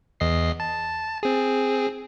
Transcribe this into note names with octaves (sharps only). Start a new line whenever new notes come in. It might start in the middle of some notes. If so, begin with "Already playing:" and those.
E2 D#5 C7
A5
C4 G#4